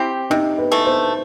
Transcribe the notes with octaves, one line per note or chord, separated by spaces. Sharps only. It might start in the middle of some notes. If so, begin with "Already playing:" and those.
Already playing: C4 E4 G4
C3 D#4
B4
E3 A3
C5